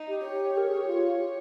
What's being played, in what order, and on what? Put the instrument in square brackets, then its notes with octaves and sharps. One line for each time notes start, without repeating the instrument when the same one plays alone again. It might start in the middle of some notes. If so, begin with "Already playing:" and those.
Already playing: [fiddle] D#4
[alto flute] G4
[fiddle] C#5
[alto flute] A#4
G#4
G4
F4
G4